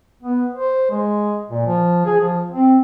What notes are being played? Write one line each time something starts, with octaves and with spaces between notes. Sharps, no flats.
B3
C5
G#3
A#2
F3
G#4
F3
C4